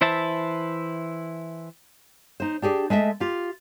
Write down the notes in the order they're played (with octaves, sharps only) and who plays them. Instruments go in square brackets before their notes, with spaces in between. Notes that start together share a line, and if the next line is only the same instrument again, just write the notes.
[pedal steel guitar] E3 E4 C5 E5 A5
[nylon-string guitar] D#4 C5
D4 G4 G#4 D5
G#3 A3 D#5 E5
F4 G4